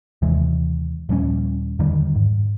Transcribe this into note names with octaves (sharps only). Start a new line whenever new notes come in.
D#2 C3 E3 G#3
D#1 F3 G3 C#4
E2 D3 D#3 G3
G#2